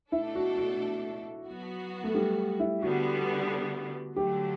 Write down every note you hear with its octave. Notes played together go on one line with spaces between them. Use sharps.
B2 A3 D4 E4 A4
F#4
F#4
F#3 B3 F#4
A3
G3
E4
D3 G3 B3 F#4
D3 F#3 A3 G4